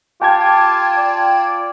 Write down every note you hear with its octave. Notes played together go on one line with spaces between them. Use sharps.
F4 G4 G5 A5 G#6
D5